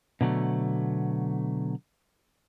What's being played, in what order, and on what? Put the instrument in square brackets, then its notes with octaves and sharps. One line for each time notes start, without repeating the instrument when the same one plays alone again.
[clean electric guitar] B2 D3 F#3 A3